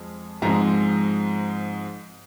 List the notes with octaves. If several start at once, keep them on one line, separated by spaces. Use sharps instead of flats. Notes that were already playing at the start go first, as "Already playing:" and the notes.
Already playing: F2 F3 G#3
G#2 F3 G#3 C4 A#5